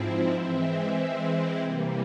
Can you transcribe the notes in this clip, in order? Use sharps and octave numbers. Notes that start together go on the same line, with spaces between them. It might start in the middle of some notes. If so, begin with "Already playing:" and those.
Already playing: G#2 F3 C4 E4
E3 G#3 C4 E4
C3 E3 G3 A#3